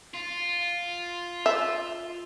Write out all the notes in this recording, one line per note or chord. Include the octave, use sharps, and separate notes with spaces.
F4
E5